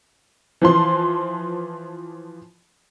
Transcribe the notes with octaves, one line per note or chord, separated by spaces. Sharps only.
E3 F3 C6